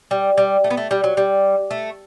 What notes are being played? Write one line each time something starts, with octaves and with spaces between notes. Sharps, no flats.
G3
G3
A3
B3
A3
G3
F#3
G3
A3